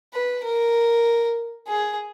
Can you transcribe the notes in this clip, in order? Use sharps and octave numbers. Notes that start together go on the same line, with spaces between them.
B4
A#4
G#4